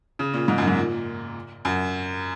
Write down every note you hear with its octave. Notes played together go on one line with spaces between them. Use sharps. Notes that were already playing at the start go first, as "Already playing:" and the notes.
C#3
A#2
G#2
F#2
G#2
A#2
F#2